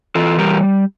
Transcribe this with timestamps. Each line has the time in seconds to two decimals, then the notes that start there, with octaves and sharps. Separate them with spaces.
0.15 E3 F4 A4
0.39 G3 G4 A#4